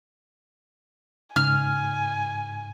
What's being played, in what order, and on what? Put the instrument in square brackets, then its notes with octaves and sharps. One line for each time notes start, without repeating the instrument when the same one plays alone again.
[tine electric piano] G#2 [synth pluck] C#3 [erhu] G#5 [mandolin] F6